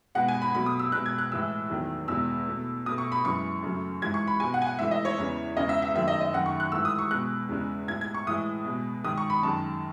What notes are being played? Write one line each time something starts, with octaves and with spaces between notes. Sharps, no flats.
B2 G#3 F#5
G#5
B5
B2 F#3 A3 B5
D#6
E6
B2 G#3 F#6
G#6
F#6
A2 E3 G#3 E6
E2 D#3 F#3 A3
E2 B2 G#3 E6
B2 A3
B2 A3 D#6
C#6
B5
F#2 E3 G#3 C#6
F#2 C#3 F#3 A3
G#2 E3 G#3 G#6
C#6
B5
B2 G#3 G#5
F#5
G#5
F#5
G#2 E3 A3 E5
D#5
C#5
E2 C#3 E3
E2 C#3 G#3 D#5
E5
E5
F#2 D#3 F#3 A3 E5
D#5
D#5
F#2 D#3 A3 F#5
C#6
F#6
G#2 E3 A3 E6
D#6
C#6
B2 G#3 F#6
E2 C#3 G#3
A2 G#3 G#6
G#6
C#6
A2 E3 G#3 D#6
B2 G#3
G#2 D#3 G#3 D#6
C#6
B5
F#2 D#3 G#3 A5